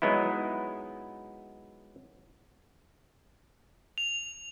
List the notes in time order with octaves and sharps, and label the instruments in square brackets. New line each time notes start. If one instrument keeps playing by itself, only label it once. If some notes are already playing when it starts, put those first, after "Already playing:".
[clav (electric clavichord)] F#3 G#3 B3 D#4 E4
[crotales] F7